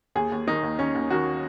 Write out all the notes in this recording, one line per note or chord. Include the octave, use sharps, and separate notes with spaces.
D#2 G#4
D#2
D#3 D#4
D#2
D#2 C#4
D#2
D#3 F#4